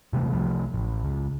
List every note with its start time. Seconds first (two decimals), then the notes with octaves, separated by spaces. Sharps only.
0.13 F1 C3 E3 A3
0.31 C2 F3 A3
0.74 A1
1.05 C#2